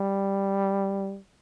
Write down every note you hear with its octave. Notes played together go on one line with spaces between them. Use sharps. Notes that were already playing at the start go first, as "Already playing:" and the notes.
Already playing: G3